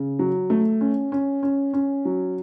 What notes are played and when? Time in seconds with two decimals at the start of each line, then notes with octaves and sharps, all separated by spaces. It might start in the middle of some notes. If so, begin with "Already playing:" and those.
Already playing: C#3
0.19 F#3
0.50 A3
0.81 C#4
1.12 C#4
1.43 C#4
1.73 C#4
2.05 F#3